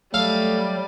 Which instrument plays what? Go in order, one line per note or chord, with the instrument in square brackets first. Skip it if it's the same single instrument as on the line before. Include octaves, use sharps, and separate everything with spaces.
[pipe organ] F#3 [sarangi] G3 [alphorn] A3 [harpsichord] A4 F5